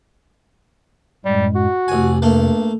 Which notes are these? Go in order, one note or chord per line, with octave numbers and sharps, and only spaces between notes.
F#2 A2 G3 G#3
F#4
A1 F2 C3 G#5
G2 A3 A#3